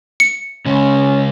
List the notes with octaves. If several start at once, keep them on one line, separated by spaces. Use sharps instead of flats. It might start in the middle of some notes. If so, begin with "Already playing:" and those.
C#7
C#3 G#3 C#4